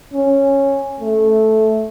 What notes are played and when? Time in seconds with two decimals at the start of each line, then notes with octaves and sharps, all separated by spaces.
0.14 C#4
1.00 A3